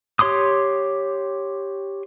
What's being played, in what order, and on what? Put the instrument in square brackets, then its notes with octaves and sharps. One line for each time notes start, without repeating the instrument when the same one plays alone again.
[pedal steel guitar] G4 C#5 C6 D6 D#6